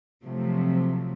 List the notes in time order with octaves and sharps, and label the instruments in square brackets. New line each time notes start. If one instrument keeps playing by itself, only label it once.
[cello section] C3 F3 F#3 A3